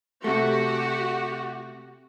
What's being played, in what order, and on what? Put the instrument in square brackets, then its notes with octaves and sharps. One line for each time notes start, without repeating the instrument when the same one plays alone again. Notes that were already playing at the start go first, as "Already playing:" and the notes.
[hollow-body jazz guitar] C3 A3 [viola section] F#4 G4